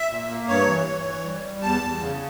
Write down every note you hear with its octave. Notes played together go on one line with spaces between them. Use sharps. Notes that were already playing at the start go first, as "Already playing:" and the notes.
Already playing: E5
A#2
A#3
G2 C#5
E3
E3
E3
G3
G3
E2 A5
E2
C#3